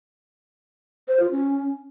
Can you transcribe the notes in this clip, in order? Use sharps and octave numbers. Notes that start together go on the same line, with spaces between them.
C5
F4
C#4